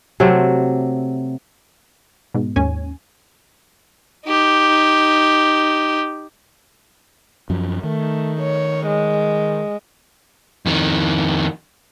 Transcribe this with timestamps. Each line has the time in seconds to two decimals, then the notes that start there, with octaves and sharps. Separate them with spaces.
0.20 C3 F#3 A3 C4
2.34 G#2 B2
2.56 D#2 G#2 C#4 G#5
4.26 D#4 G4
7.50 F#2 F3
7.83 D#3 A3
8.41 C#5
8.87 G#3
10.66 F2 D#3